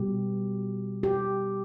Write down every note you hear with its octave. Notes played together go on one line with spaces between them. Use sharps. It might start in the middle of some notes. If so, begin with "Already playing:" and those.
Already playing: B2 G3 G4
G4